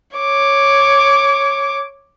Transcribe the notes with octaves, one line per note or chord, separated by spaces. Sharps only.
C#5 D6